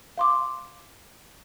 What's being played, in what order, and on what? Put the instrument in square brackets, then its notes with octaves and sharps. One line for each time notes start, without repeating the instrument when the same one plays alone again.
[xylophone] F5 C6 D6